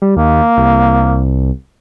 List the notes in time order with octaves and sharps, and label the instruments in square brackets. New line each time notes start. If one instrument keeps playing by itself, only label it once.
[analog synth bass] G3
[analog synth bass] D#2 [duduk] A#3
[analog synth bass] C2